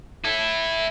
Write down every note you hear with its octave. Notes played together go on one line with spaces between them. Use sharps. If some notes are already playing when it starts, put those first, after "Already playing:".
E4 A4